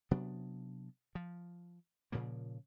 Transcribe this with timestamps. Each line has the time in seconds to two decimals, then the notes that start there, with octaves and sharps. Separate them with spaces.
0.11 C3 F#3 B3 D4
1.15 F3
2.12 A#2 C#3 F3 A#3